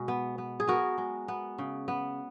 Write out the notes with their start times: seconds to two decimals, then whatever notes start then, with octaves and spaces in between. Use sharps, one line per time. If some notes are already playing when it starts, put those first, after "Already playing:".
Already playing: B2 G#3
0.08 B3
0.38 B3
0.60 G#4
0.67 B3 F#4 A#4
0.98 G#3
1.28 B3
1.58 C#3
1.88 B3